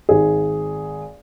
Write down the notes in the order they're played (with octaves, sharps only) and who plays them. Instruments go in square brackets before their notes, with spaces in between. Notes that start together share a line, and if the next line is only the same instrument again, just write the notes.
[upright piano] G#1 G#4